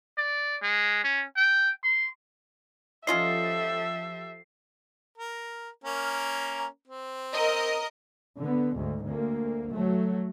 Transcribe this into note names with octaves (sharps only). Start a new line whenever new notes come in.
D5
G#3
C#4
G5
C6
F3 C#4 F4 G4 A4 D#5 E5 C7
A#4
A#3 C#4 A#4
C4
A#4 D#5
D3 B3
D2 G#2
D2 A#3
F#3 A3